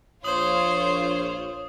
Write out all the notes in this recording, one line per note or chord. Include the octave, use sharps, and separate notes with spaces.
A#1 F4 C5 C#5 D#6 F#7